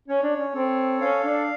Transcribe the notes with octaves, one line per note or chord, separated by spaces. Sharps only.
C#4 C#5
D4
C#4
C4 A4
C#4 F5
D4